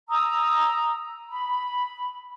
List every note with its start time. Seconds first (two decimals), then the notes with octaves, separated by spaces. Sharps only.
0.09 A#5 D#6 E6
1.30 B5